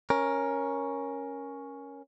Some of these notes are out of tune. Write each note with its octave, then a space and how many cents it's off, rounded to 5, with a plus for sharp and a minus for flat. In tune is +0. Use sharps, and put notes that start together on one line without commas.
C#4 +0 A#4 +10